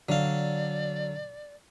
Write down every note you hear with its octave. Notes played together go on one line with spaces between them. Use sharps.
D3 F#3 D5 F5